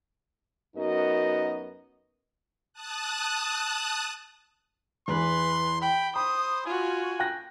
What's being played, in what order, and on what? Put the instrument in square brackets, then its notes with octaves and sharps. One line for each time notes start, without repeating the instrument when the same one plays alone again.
[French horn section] F#2 B3 D#4 F#4 A#4 D#5
[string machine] A5 D#6 F#6
[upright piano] E2 E3 [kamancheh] B4 [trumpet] C6
[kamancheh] G5 [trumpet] B5
[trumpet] C5 [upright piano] B5 [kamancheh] D#6
[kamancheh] F4 F#4 [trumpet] G#5
[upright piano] G5 F#6 A#6